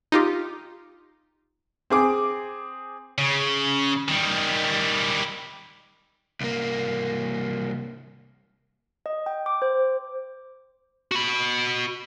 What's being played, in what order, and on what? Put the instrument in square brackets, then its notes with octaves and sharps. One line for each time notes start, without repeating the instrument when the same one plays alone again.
[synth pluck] D#4 F4 G4
[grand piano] C4 G#4 D6
[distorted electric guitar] C#3
D#3 G3
[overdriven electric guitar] C2 A#3
[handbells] D#5
G5
D6
C5
[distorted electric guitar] F#4 B5